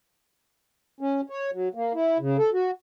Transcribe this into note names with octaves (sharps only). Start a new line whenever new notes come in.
C#4
C#5
F#3
A#3
E4
C#3
A4
F#4